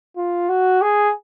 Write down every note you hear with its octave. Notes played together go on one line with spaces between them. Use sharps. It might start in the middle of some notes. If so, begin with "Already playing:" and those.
F4
F#4
G#4